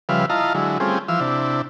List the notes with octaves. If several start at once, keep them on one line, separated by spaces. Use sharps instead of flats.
C#3 F3 G3 B4 E5 F5
E4 F4 D#5 F5 A5 A#5
D3 F#3 G#3 E4
G3 A3 C4 C#4 F4 G#4
E3 F3 F5 E6
C3 D4 E4